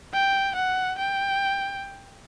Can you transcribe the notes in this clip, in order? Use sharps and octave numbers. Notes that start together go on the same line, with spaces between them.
G5
F#5
G5